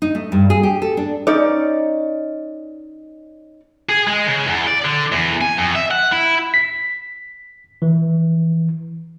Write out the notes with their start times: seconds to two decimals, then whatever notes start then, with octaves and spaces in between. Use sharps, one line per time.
0.02 D#4
0.15 A3
0.32 G2
0.50 G#4
0.63 G4
0.82 A4
0.97 D4
1.27 C#4 D#4 D5
3.89 G#4
4.07 G#3
4.27 C#3
4.47 E2
4.67 D5
4.84 D3
5.12 E2
5.41 G#5
5.57 F2
5.75 E5
5.91 F#5
6.12 E4
6.54 B6
7.82 E3